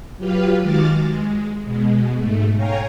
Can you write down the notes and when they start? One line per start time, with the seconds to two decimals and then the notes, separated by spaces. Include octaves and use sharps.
0.18 F#3 F4 G4 B4 F5
0.61 D#3 G#3 F#4 D6 F6 A6
0.99 G#3
1.65 B2 G#3
2.17 G#2 A3
2.56 C#5 F5 G5 G#5 A#5